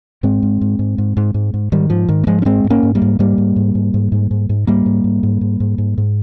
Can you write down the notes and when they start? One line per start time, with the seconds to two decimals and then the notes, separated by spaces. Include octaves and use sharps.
0.23 G#2 G#3 C4
0.43 G#2
0.61 G#2
0.79 G#2
0.98 G#2
1.17 G#2
1.34 G#2
1.54 G#2
1.72 G#2 D#3 G3
1.90 G#2 F3
2.09 G#2 D#3
2.24 A#3
2.27 G#2 F3 G#3
2.42 C#4
2.45 G#2 G#3 C4
2.64 G#2
2.70 A#3 C#4
2.83 G#2
2.95 G3 A#3
3.02 G#2
3.19 G#2 G3 A#3
3.38 G#2
3.56 G#2
3.75 G#2
3.94 G#2
4.12 G#2
4.31 G#2
4.49 G#2
4.67 G#2 G3 A#3
4.86 G#2
5.04 G#2
5.23 G#2
5.41 G#2
5.60 G#2
5.78 G#2
5.98 G#2